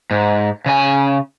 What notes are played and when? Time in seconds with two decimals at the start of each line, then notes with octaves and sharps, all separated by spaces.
0.11 G#2
0.66 C#3 G#5